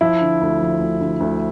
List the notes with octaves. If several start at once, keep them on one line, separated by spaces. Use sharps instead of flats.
F3 E4
D3
D2
F3
D2
D2
D2